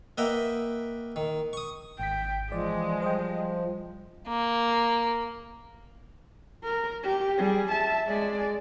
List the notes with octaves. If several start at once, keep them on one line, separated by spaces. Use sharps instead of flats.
A#3 B4 D#5 E5 F#5 G5
D#3
C#6 D#6
G#1 G5 B6
E3 F3 G#3 D5
G3 C5 D#5 G5
A#3
A#4
G4
G3 G#4
E5 A5
G#3 D5